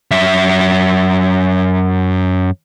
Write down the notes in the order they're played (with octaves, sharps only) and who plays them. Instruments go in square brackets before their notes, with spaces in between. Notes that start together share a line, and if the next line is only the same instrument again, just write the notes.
[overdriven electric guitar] F#2 E5